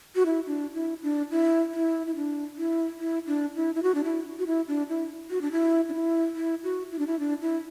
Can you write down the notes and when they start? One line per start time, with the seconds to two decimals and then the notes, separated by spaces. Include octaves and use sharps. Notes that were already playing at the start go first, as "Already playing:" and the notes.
0.16 F#4
0.26 E4
0.47 D4
0.74 E4
1.03 D4
1.31 E4
1.73 E4
2.07 E4
2.15 D4
2.57 E4
2.99 E4
3.27 D4
3.56 E4
3.75 E4
3.83 F#4
3.95 D4
4.04 E4
4.39 F#4
4.47 E4
4.68 D4
4.89 E4
5.31 F#4
5.41 D4
5.52 E4
5.89 D4
5.94 E4
6.35 E4
6.64 F#4
6.91 E4
6.99 D4
7.07 E4
7.19 D4
7.41 E4